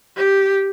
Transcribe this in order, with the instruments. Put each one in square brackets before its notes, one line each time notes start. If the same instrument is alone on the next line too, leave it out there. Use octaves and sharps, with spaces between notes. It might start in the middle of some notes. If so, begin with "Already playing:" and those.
[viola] G4